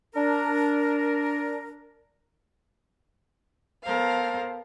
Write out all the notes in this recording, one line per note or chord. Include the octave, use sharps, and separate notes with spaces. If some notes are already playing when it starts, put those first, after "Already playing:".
D4 A#4
B3 A4 A#4 C5 F5